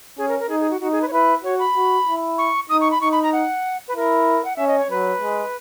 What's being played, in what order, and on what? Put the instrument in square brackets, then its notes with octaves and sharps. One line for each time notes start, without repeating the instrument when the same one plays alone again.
[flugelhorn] C#4 [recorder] G#4
[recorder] A#4
A#4
[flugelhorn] D#4 [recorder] G#4
[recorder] G#4
F#4
[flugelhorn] D#4 [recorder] F#4
[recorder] G#4
B4
C#5
[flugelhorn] E4 [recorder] B4
[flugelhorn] F#4 [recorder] C#5
[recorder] B5
[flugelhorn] F#4
E4
[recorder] C#6
[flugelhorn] D#4 [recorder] D#6
[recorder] C#6
B5
[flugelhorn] D#4 [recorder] C#6
[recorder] B5
A#5
F#5
B4
[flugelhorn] E4 [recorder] A#4
[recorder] F#5
[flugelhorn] C#4 [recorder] E5
[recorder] D#5
C#5
[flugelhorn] F#3 [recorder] B4
[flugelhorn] G#3